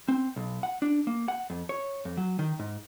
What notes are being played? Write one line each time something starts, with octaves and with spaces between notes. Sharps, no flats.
C4
B1
F#5
D4
A#3
F#5
F2
C#5
F2
F#3
D#3
G#2